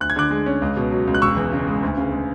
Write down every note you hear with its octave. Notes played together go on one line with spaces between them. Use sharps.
D2 F#6
G#6
D3 D6 F#6
G#3
C#4
C#2
B2
F#3
C#2
F#6
E1 C#6 E6
E2
C#3
G#3
D2
C#3
G#3